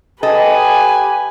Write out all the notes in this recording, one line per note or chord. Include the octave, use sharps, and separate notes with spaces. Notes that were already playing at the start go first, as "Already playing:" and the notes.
G4 A4 B4 D#5 G#5